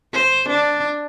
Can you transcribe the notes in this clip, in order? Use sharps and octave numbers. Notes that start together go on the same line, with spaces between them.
C5
D4